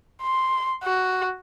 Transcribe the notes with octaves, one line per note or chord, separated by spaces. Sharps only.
C6
F#4